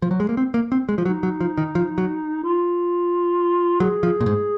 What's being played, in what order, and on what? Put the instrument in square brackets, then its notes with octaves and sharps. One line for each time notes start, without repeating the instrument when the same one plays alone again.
[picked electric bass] F3
F#3
G#3
A#3
C4
A#3
C4
G#3
F3
[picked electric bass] F#3 [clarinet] D#4
[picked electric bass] F#3
F3
D#3
F3
F#3
[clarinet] F4
[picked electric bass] F#3 [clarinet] G#4
[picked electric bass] F3
A#2
G#2